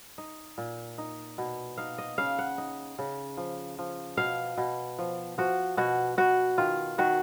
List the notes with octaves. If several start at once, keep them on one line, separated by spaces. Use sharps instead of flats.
D#4
A#2
D#4
B2
D#4 F5
D#5
C#3 F5
F#5
D#4
C#3
F3
F3
B2 F5
B2
F3
F3 F#4
B2 F#4
B2 F#4
D#3 F4
D#3 F#4